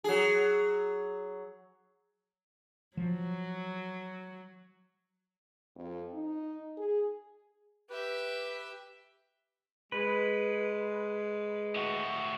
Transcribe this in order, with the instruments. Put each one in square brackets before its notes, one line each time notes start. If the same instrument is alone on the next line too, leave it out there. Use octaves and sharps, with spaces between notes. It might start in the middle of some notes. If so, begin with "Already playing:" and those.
[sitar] F#3 G#4
[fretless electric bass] F3 [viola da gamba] F#3
[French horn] F2
D#4
G#4
[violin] G4 E5 [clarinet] B4
[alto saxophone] G#3 [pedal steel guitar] B4
[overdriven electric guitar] A2 F#4